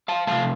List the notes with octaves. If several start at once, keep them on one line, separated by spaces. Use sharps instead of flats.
F5 A5
C3 F3 A3 F5 A5